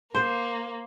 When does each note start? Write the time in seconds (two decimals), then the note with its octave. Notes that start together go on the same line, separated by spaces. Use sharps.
0.15 A#3 C5